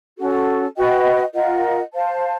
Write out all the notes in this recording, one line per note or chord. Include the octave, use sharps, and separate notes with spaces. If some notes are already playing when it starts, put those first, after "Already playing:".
C#4 F#4 A4
F#4 B4 D#5 G5
F4 A#4 D#5 F#5
C5 F5 A5